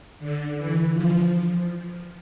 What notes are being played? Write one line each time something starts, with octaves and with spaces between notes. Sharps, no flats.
D3
E3
F3